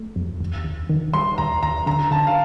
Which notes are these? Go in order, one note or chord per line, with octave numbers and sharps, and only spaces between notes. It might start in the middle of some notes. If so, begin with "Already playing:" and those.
Already playing: A3
F2
D#2
D#2
D#3
G3 C6
D#2 A#5
D#2 A#5
D3 A#5
D3 A5
F5